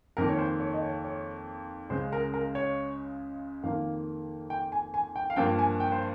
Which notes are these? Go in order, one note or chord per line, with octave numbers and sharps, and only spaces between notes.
F2 D#3 A#3 A#4
C#5
C5
C#5
D#5
C#5
C#5
C#2 C#3 G#3 C5
A#4
A#4
C#5
F2 D#3 A#3 F5
G5
G#5
G#5
G5
F5
G2 F3 A#3 G5
G#5
G5
C5